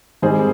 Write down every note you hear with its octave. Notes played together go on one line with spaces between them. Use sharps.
G#2 D#3 G3 C4 G#4 C5